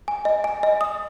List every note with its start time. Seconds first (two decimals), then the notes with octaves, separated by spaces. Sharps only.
0.08 G#5
0.25 D#5
0.44 G#5
0.63 D#5
0.81 D#6